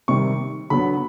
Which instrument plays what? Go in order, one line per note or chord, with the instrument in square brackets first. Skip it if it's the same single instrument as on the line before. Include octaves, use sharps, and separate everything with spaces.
[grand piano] C3 D#3 G3 C#6
D3 F#3 B3 B5